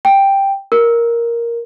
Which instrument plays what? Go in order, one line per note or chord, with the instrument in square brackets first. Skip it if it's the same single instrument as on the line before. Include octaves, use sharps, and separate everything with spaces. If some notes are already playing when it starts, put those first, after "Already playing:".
[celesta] G5
A#4